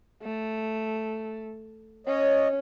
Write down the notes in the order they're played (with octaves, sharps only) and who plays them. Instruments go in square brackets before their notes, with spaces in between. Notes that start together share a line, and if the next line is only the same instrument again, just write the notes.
[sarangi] A3
[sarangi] C#4 [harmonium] C#5 D#5